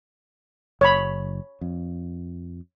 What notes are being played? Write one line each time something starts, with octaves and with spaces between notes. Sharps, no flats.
F#1 C#5 B5
F2